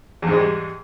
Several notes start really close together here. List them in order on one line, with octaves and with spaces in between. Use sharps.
E2 G#2 G#3 G3